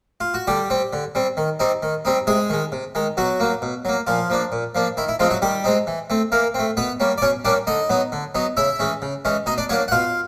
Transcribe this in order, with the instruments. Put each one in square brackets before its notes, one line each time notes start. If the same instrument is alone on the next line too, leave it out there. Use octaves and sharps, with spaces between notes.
[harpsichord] F4
F#4
D3 G3 G4
G3 C4
D3
G3 C4
D#3
G3 C4 D#4
D#3
G3 C4 D#4
C3 G#3 G#4
D#3 G#3
C3
D#3 G#3
B2 F#3 F#4
F#3 A#3
B2
F#3 A#3
A#2 F3 F4
F3 A#3 D4
A#2
F3 A#3 D4
D#3 E4
E4
F3 G#3 C4 D#4 F4
F#3 F#4
D#3 G3 G4
G#3 C4 D#4
E3
A3 C4
E3 A#3 A#4
A3 C4
B2 B3 B4
G3 A#3 C#4
D5
B2 C#4 C#5
G3 A#3 C#4 D4 D5
D3 D#4 D#5
F#3 B3 D#4
D3
F#3 B3 D#4
C#3 E4 E5
E3 G#3 C#4
C#3
E3 G#3 C#4
B2 D#4 D#5
D4 D5
F#3 A#3 C#4 D4 C#5
F#5
B2 F4 F5